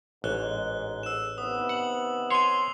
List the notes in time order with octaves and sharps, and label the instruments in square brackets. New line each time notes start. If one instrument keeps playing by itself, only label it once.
[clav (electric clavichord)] A1 [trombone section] G#2 [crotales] F#6 G7
[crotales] E6 E7
[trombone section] C3 D#3 B3 [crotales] D#6
[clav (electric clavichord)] F#5 [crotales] F#7
[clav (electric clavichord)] C#5 G#5 [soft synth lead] C6 [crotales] C7 F7